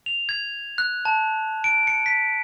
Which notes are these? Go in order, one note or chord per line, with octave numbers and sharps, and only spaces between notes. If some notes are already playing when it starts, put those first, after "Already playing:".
F7
G#6
F#6
A5
D7
C#7
B6